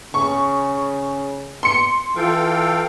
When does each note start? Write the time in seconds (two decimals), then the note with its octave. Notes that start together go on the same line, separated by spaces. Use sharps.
0.14 C#3 C#6
1.63 C6 C#7
2.16 E3 F4 A4 F5 G5